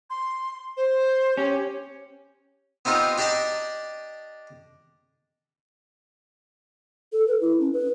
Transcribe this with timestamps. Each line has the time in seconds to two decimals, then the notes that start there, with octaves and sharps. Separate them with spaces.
0.10 C6
0.77 C5
1.37 C#4 G4
2.85 B3 C4 D#4 F4 G4
3.18 D4 G4 D5 D#5 A5
7.13 A4
7.28 B4
7.41 E4
7.60 C#4
7.73 B4